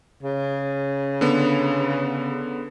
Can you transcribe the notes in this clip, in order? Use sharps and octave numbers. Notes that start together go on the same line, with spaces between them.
C#3
D3 B3